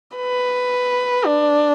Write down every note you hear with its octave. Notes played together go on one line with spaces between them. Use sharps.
B4
D4